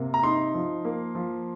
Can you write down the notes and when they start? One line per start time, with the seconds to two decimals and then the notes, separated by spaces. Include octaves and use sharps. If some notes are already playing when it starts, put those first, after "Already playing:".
Already playing: C3 A#3
0.14 A#5
0.23 D#4 C6
0.55 F3
0.85 A#3
1.15 F3